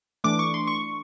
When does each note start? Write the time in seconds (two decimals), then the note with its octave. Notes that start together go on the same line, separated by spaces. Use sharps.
0.24 E3 A3 D4 D6
0.39 C#6
0.54 C6
0.67 C#6